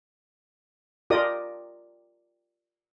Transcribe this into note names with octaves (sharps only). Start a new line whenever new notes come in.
F4 G4 A#4 D5 D#5 D#6